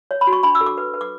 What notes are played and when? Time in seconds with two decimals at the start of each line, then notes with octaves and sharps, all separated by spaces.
0.11 C#5
0.21 B5
0.27 F#4
0.33 C#6
0.43 D4 B5
0.55 E6
0.61 A4
0.66 D6
0.77 B4
0.94 B4
1.01 D6